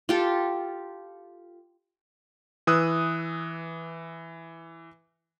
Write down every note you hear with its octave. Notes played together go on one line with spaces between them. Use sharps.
F4 G4 A4
E3 D#6 E6 F#6